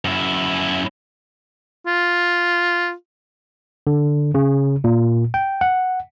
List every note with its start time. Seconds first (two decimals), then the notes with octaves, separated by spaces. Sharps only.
0.05 F#2 E4
1.86 F4
3.87 D3
4.35 C#3
4.84 A#2
5.34 G5
5.61 F#5